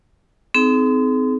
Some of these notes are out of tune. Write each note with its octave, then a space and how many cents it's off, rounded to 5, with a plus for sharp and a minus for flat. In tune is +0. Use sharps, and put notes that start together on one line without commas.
C4 -30 D#4 +5 G#4 +40